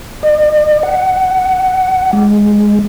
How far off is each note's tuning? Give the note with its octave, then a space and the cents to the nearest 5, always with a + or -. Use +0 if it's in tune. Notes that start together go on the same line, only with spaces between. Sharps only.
D#5 -45
F#5 +15
G#3 +0